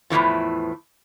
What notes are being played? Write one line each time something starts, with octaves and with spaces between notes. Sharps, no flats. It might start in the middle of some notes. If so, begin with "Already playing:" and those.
E2 A2 C3 E3 F3